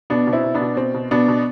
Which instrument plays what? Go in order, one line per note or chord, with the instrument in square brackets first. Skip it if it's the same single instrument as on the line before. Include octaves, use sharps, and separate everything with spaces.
[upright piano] B2 B3 D4
B2
C4 E4
B2
B3 D4
B2
B2 C4
B2
B2 B3 D4
B2